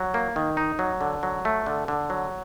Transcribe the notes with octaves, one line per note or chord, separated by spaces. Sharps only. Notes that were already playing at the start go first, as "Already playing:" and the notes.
Already playing: F#3
A#3
D#3
D#4
F#3
D3
F#3
A3
D3
D3
F#3